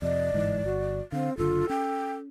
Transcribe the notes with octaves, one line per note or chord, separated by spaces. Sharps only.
F2 C3 D5 D#5
G1 G#2 E3
G1 F#4
D3 C4 F5
F#1 D3 F4 A4
C#4 G5